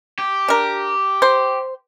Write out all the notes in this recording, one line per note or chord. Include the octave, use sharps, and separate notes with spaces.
G4
D4 A#4
C5